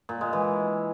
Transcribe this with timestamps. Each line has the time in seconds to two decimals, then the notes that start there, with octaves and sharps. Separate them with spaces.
0.09 A#2
0.21 G#3
0.33 E3